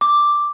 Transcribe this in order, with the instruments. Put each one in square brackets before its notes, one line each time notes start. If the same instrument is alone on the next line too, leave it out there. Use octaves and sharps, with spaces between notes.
[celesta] D6